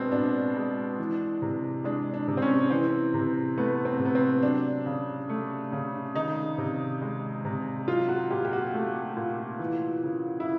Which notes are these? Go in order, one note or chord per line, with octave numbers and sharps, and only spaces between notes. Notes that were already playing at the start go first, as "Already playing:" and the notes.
Already playing: B2 G#3 B3 C4 D4
B2 D4
G#3
E3
C3
G#3 D4
D4
C3
C4
C#4
E3 C4
C3
A3 B3
C4
C3
B3
C4
F#3 D4
C#3
A3
C#3
D#3 D#4
C3
G#3
C3
F#3 F4
F#4
A#2 G4
G4
F#4
A3
A#2
E3
C#3
E4